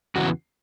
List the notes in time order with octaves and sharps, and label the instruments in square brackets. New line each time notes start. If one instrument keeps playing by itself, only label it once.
[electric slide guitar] E2 C#3 E3 B3 F#4